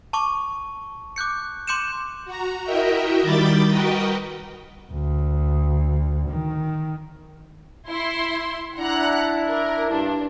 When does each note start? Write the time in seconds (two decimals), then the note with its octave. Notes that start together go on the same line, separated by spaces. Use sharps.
0.13 A5 C#6 D6
1.16 D6 F#6 G6 C#7
1.67 C6 D6 G6 C#7 D#7 E7
2.25 F#4 A#5
2.64 E4 F#4 A#4 D#5 E5 G5
3.22 D#3 G3 B5 D6 G6 A6
3.68 F#4 A#4 B4 D#5 G5
4.92 D2
6.29 D#3
7.88 E4 C6
8.78 D4 E4 F#5 A#5 F#6
9.47 A#4
9.90 G2 D4